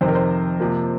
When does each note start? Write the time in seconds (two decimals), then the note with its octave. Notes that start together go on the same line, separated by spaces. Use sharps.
0.01 F2 C3 D#3 C5
0.08 A#4
0.15 C5
0.59 C3 F3 A#3